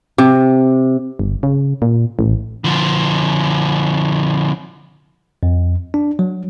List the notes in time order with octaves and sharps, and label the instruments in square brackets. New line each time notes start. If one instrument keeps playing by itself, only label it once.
[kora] C3
[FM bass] G1
C#3
A#2
A1
[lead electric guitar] D3 F3
[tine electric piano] F2
D4
F#3